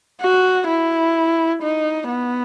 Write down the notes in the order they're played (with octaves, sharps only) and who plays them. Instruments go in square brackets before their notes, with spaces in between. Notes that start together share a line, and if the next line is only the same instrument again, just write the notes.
[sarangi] F#4
E4
D#4
B3